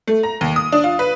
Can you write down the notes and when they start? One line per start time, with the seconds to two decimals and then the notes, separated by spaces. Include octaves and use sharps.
0.07 A3
0.23 A#5
0.41 D#2
0.56 D#6
0.72 D4
0.84 F4
0.99 B4